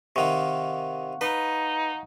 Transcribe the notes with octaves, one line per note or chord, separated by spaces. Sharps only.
C3 D#3 F5 F#5 C#6
D#4 B4